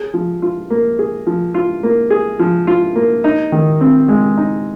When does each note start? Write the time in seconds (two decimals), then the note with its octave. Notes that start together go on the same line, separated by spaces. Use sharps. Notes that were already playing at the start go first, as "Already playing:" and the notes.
Already playing: G#4
0.14 F3
0.42 F4
0.70 A#3
0.99 G#4
1.27 F3
1.54 F4
1.83 A#3
2.10 G#4
2.39 F3
2.67 F4
2.95 A#3
3.24 D#4
3.52 D#3
3.81 C4
4.08 G#3
4.37 D#4